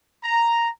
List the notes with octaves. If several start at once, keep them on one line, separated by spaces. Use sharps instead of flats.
A#5